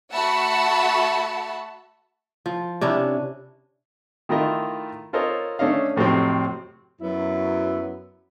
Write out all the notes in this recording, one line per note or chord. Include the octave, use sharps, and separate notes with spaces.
A3 F#4 E5 F#5 A5 B5
F3
C3 C#4 D4 E4
D#3 A3 E4 F4 A#4 D#5
F4 A4 A#4 C5 C#5 D#5
A3 C#4 D4 C#5 D#5 F5
F2 A2 C3 F#3 C4
F#2 F#3 B3 E4 E5